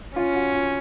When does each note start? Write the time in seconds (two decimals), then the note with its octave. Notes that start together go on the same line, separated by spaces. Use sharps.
0.16 C#4 F4
0.35 F#4
0.54 F4